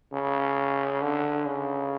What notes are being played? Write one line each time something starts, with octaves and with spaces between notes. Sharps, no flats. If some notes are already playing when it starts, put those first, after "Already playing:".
C#3
D3
C#3